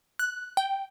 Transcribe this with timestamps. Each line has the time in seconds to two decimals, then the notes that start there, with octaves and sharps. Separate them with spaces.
0.19 F#6
0.57 G5